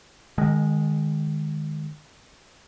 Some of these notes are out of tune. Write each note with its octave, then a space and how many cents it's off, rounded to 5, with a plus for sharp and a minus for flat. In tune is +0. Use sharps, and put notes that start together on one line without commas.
D#3 -25 G#3 +0